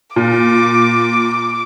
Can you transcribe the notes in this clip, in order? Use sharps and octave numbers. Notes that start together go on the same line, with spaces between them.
A#2 D6